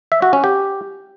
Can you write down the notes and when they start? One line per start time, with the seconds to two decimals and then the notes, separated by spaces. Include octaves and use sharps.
0.12 E5
0.22 F#4
0.33 C#4
0.44 G4